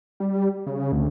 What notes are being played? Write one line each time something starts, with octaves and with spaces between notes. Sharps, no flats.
G3
C#3
D2